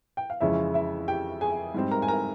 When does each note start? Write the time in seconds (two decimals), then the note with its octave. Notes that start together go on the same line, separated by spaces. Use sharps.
0.17 G5
0.30 F5
0.41 F2 C#3 E3 G#3 C#4 E4 E5
0.74 E4 E5
1.08 G4 G5
1.41 G#4 G#5
1.74 G#2 G3 C4
1.91 A#4 A#5
2.02 G#5
2.08 A#4 A#5